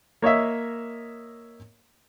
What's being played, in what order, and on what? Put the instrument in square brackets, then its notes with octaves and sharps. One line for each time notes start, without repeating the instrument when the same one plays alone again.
[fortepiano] A#3 C#5 D#5 E5